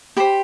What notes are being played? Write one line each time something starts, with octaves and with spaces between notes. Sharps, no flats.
G4 C5 B5